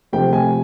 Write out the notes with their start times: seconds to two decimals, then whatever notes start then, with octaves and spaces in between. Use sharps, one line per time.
0.13 C3 F3 A3 G5
0.33 G#5